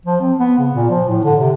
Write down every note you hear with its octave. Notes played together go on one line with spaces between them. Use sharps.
F3
C4
B3
C#3
A#2
F3
A2
D3
C3